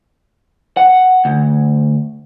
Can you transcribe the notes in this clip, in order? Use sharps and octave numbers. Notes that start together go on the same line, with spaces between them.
F#5
D2